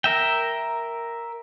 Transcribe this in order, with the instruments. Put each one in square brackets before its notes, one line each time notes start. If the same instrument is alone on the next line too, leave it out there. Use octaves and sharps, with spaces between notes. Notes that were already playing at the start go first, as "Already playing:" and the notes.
[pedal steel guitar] A#4 E5 G5